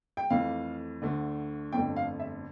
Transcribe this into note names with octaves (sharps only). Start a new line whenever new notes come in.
G5
F2 E3 A3 F5
D2 D3 A3
G1 F2 D3 A3 G5
F5
E5